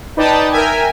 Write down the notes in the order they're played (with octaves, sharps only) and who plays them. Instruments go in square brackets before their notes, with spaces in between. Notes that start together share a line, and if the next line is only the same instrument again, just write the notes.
[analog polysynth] D#4 B4 D5 G5 A5 D#6
A#4 E5 G5 G#5